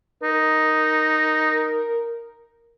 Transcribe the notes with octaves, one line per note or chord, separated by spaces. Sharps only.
D#4 A#4